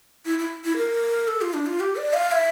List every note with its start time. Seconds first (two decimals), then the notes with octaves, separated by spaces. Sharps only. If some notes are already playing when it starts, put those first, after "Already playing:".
0.25 E4
0.39 E4
0.65 E4
0.77 A#4
1.28 A4
1.41 F4
1.54 D4
1.66 F4
1.80 G4
1.96 D5
2.13 F5
2.32 E5